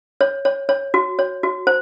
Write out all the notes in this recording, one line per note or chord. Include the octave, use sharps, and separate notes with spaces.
C#5
C#5
C#5
F#4
C#5
F#4
C5